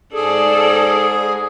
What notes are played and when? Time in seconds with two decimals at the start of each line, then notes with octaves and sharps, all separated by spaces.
0.14 G#2 G#4 A4 D5